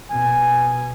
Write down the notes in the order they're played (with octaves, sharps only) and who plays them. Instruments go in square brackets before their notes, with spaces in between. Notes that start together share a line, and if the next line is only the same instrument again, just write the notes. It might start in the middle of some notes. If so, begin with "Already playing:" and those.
[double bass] B2 [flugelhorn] G#5